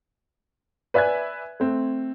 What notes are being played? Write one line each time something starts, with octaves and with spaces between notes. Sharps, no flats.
B4 D5 E5 G#5 F#6 G#6
A3 C4